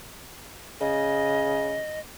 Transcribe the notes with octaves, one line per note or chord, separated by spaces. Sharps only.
C#3 D#5